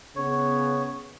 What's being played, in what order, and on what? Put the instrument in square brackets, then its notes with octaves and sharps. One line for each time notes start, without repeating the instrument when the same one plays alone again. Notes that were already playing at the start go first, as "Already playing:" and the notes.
[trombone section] C#3 B3 [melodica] C#5